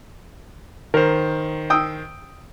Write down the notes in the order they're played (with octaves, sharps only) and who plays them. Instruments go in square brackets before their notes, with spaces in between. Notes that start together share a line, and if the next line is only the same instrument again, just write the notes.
[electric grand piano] D#3 C5 [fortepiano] A#4
[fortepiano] G5 D#6 E6